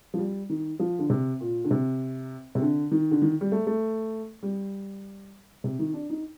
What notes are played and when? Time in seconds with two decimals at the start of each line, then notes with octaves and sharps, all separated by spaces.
0.14 F3
0.19 G3
0.50 D#3
0.79 F3
0.99 D3
1.10 C3
1.41 A#2
1.64 D3
1.71 C3
2.55 C3
2.62 D3
2.91 D#3
3.11 D3
3.22 D#3
3.41 G3
3.52 A3
3.67 A3
4.43 G3
5.64 C3
5.79 D#3
5.94 D4
6.10 D#4